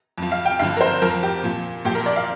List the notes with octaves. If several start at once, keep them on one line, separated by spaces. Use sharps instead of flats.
F2 F3
F5
G5
G2 D3 F3 F5
A#4
C5
F2 F3 A#4
G4
A#2 F3
A#2 F3 G4
A#4
D5
F5